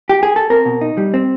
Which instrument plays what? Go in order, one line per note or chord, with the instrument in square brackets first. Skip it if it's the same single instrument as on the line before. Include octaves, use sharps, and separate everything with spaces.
[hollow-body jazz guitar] G4
G#4
A4
C4 A#4
B2
D#4
G3
C4